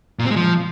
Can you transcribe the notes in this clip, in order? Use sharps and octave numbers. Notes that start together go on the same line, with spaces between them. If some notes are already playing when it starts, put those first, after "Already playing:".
A#2
C4
G#3
F3